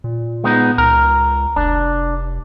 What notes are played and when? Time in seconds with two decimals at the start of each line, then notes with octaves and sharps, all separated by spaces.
0.04 A#2
0.44 G#3 B3 D#4
0.78 C#2 A#4
1.56 F1 D4